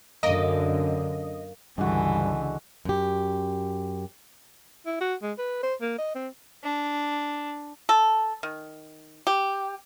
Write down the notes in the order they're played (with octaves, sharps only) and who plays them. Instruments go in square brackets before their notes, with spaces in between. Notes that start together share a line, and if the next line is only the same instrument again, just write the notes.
[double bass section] F#2 D3 [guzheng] A#3 [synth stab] D#5
[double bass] C#2 D3 [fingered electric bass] G2 [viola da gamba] E3 [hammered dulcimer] G#3 F#4
[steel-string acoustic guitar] F#2 G4
[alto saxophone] E4
F#4
G#3
B4
C5
A#3
D#5
C4
[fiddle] D4
[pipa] A4
D#3
G4